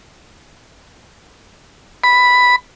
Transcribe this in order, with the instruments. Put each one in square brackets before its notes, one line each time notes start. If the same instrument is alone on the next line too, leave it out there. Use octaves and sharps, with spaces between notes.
[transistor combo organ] B5